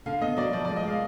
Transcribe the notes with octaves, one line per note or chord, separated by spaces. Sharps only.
D3 F5
B3 D#5
F#3 D5
F3 D5
G#3 D5
D#5
G#3 F5